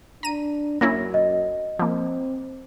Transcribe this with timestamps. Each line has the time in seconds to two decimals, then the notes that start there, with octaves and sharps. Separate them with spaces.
0.23 D4 A#5 D#7
0.81 F#2 A#3 C#4 E4 A#6
1.14 D#5
1.79 F3 A#3 C4